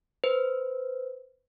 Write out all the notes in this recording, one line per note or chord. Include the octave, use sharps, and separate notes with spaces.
B4 C5